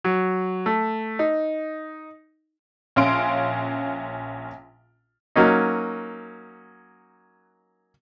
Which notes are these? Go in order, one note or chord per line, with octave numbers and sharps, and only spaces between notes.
F#3
A3
D#4
A#1 C#4 F5 C6 D7
F#3 A#3 C#4 D#4